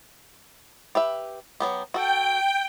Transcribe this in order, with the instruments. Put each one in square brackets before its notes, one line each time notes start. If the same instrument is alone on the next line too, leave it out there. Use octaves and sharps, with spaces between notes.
[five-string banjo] G4 B4 E5
F#3 B3 G4
[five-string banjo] F#4 A4 [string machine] G5